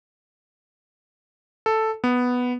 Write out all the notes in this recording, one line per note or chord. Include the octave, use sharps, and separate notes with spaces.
A4
B3